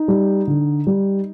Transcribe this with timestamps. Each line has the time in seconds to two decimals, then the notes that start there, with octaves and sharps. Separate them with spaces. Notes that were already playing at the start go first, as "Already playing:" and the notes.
Already playing: D#4
0.08 G3
0.47 D3
0.87 G3